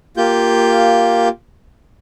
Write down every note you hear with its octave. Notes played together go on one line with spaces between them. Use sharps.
A#3 F4 G4 G6